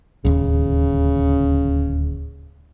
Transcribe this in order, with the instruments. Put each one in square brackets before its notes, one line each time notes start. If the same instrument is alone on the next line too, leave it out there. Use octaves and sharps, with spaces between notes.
[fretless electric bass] D1 D#2 [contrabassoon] C#3